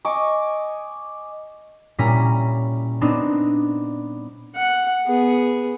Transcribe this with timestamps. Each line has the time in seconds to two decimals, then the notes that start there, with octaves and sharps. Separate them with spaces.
0.05 D#5 G#5 C#6 D6
1.98 A#2 G3 C#4 E4 A#5 B6
3.01 B3 C4 D4 D#4
4.55 F#5
5.06 B3 G#4